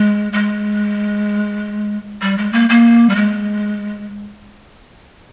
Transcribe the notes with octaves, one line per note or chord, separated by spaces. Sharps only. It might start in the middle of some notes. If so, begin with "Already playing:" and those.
Already playing: G#3
G#3
G3
G#3
A#3
A#3
G3
G#3